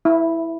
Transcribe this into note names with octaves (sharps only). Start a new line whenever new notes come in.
E4